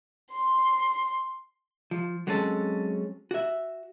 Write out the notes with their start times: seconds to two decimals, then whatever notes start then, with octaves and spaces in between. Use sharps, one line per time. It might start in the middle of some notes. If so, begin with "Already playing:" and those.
0.32 C6
1.91 F3
2.27 F#3 G#3 C4 C#4 A4
3.31 F#4 E5